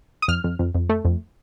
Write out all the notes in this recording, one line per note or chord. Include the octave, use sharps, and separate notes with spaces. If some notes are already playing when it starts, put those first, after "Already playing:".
D#6
F2 F6
F2
F2
F2
A3
F2